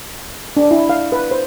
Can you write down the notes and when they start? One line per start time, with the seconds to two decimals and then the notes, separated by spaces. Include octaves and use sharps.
0.57 D4
0.71 E4
0.90 F5
1.12 B4
1.31 C5